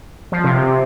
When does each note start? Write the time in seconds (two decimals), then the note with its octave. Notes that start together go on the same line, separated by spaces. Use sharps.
0.32 F3
0.44 C3
0.57 C3